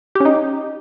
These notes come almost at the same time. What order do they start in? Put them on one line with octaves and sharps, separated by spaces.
G4 C#4 D#4